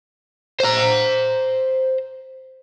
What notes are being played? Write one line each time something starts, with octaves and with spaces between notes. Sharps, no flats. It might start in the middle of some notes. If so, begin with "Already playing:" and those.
C5 A#5